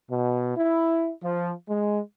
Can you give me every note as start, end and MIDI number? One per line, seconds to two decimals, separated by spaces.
0.10 0.56 47
0.56 1.11 64
1.21 1.51 53
1.68 1.99 56